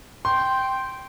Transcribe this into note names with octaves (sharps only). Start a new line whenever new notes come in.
G5 C6